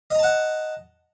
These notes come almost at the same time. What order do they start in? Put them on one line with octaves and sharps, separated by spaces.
D#5 A#5 A5 F#5